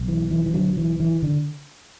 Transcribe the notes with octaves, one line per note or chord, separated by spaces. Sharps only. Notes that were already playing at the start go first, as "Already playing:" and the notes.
Already playing: B1
E3
E3
E3
D3 F#3
E3
E3
D3